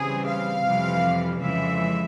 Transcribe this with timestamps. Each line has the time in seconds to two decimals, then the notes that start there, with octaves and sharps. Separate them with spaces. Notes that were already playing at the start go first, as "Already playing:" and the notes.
Already playing: C#3 E3 G3 C4 G#4
0.26 F5
0.65 F2 C3 E3 G3
1.41 F2 C#3 E3 G#3 E5